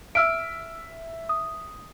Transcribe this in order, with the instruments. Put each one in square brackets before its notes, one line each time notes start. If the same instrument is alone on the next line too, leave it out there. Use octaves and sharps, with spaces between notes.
[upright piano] E5 [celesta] E6 F6 D7
[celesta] D#6